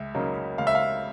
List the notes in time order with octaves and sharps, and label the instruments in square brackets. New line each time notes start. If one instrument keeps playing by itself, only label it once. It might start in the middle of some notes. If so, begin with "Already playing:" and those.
Already playing: [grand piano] C#2 E5
C#3 F#3 A#3 D#4
C#2 F5
E5
F5